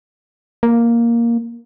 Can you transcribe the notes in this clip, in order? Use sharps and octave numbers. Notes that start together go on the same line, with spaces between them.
A#3